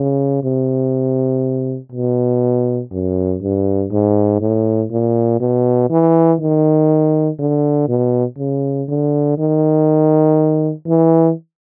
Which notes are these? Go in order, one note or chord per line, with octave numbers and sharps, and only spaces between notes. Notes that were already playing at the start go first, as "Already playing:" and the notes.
Already playing: C#3
C3
B2
F#2
G2
G#2
A2
A#2
B2
E3
D#3
D3
B2
C#3
D3
D#3
E3